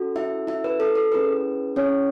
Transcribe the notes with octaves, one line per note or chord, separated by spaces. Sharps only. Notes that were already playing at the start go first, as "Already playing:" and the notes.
Already playing: C#4 F#4 A4
E4 E5
E4 E5
B4
A4
A4
C#4 E4 G#4 B4
C#4 C#5